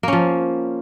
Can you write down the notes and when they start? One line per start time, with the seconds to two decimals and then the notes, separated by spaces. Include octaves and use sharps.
0.03 A#3
0.08 C#4
0.13 F3